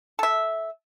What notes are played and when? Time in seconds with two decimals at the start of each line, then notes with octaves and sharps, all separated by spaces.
0.19 A4 E5